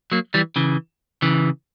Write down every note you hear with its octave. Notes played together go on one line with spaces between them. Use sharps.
F#3 A#3
E3 G3
C#3 E3
C#3 E3